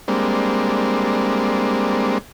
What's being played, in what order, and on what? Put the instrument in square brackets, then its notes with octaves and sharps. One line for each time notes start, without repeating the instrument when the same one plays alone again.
[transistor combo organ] G3 G#3 A#3 C4 D4